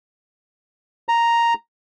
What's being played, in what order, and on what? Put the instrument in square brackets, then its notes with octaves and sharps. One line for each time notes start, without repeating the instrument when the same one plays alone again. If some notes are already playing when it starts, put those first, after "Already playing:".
[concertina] A#5